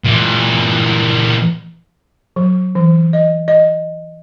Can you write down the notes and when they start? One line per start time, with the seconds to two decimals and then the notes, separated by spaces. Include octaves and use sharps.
0.05 A#2 E3
2.36 F#3
2.75 E3
3.13 D#5
3.48 D#5